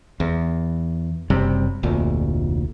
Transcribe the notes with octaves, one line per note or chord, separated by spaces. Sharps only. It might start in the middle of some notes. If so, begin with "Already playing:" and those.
E2
F#1 C3 G3
F1 D2 A#2